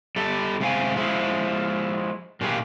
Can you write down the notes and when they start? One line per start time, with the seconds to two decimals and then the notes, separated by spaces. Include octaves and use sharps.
0.16 G3 A4
0.60 C3 G#3 B3 C4 F5 G#5
0.96 F3 G#3 E4
2.41 A#2 A#3 G4 G#4 B4